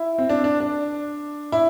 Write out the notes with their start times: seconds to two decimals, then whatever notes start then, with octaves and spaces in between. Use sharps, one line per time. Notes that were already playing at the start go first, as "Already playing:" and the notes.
Already playing: E4
0.18 C4
0.29 D4
0.44 D4
0.60 D4
1.52 E4